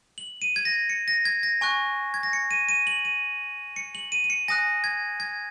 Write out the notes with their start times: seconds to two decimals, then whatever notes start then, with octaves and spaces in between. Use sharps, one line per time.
0.18 F#7
0.42 D#7
0.56 G#6
0.65 A#6
0.90 C#7
1.08 A#6
1.25 G#6
1.43 A#6
1.61 G#5 C#6 F#6
2.14 G#6
2.23 A#6
2.33 C#7
2.51 D#7
2.69 D#7
2.87 F#7
3.05 D#7
3.76 C#7
3.95 F#7
4.12 D#7
4.24 D#7
4.30 C#7
4.48 G#5 D#6 F#6 A#6
4.84 G#6
5.20 G#6